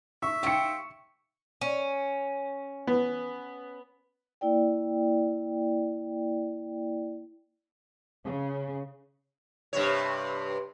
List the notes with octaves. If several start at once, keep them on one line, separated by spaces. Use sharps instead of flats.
E5 C#6
F4 G4 C5 C#6 C#7
C#4
B3
A#3 E4 D5 G5
C#3
G2 C3 C#5